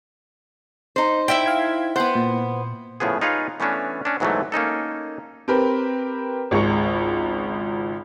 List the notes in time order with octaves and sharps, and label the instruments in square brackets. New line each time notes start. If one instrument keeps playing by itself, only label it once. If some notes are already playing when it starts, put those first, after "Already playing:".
[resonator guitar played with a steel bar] D#4 C5
[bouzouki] E4 E5 G5
[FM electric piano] F5 G#6
[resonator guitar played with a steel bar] B3 C5 [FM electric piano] F#5 C6 F#6
[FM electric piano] A#2
[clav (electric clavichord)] A2 C#3 F3 B3 G#4
D#4 F4 G#4 B4 C#5 F5
E3 A3 B3 C#4 D4
C#4 D4
G#2 B2 E3 F#3 G#3 A3
A#3 C#4 D#4 A4
[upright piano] C4 G4 A#4 B4 B5
G#1 C#2 G#3 C#6 C#7